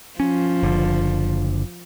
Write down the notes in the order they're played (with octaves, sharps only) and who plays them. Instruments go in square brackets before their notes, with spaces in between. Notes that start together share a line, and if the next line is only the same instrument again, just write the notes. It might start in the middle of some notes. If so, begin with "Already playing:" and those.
[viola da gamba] F3 [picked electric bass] C#4
[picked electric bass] F#1 D3